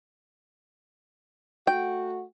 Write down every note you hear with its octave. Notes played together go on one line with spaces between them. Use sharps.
A3 F#4 G5